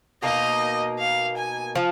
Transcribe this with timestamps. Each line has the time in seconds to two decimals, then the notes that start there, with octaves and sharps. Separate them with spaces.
0.22 B2 A#3 D#4 D#5
0.99 F5
1.37 G#5
1.75 F3